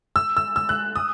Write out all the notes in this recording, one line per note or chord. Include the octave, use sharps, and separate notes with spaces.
E6
E6
E6
F#6
D#6